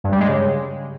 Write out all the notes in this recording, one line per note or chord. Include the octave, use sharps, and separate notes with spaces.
G2
G3
G#3
C#3